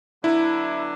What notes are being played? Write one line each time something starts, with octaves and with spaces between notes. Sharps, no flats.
D3 F#3 B3 D4 E4